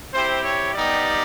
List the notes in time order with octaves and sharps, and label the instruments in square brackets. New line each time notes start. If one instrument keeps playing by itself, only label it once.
[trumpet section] C4 E4 G4 C5
C#5
G3 B3 D#4 G4 D5